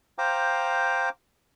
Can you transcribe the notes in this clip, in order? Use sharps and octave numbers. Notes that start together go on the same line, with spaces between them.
C5 F5 G5 A#5 D6